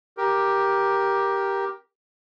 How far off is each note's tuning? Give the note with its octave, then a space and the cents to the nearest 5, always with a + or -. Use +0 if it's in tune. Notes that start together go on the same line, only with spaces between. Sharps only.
G4 +0 A#4 +10